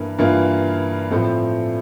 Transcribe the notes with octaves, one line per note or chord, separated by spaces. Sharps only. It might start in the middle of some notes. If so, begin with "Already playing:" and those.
Already playing: G2 E3 A#3
G2 E3 A#3 F4
A2 F3 A3 C4